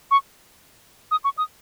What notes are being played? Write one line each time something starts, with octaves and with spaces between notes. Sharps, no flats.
C#6
D#6
C#6
D#6